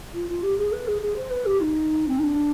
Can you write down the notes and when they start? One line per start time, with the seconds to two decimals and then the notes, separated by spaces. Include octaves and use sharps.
0.13 F4
0.28 F4
0.42 G4
0.57 G#4
0.72 B4
0.87 G#4
1.01 G#4
1.16 C5
1.30 B4
1.45 G4
1.60 D#4
2.08 C4
2.18 D#4
2.23 D4